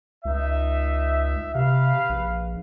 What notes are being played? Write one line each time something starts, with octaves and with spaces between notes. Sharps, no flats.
C#2 D#4 E5
C3 B4 F5
A#1